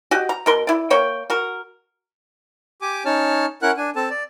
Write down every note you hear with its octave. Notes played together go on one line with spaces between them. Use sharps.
F#4 G4 D#5
A#5
B2 A#4 C6
E4 D5
A#3 C#5 G5
F#4 A#4
G4 G#5 D6
C#4 D#4 C#5 A5 F6
C#4 E4 A#4 F#5 F#6
D4 G#5
C4 A4 A5
D5